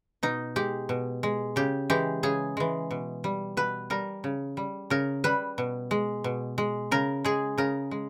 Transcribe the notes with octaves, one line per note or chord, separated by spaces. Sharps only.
B2 D#4
G#3 G4
B2
G#3
C#3 G4
E3 G#3 G4
C#3 G#4
E3 G#3
B2
G3
B2 B4
G3 A#4
C#3
G3
C#3 A#4
G3 B4
B2
G#3
B2
G#3
C#3 A#4
G#3 G#4
C#3 A#4
G#3